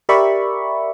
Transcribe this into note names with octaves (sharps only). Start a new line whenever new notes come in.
G4 A#4 D5 E5 B5 C#6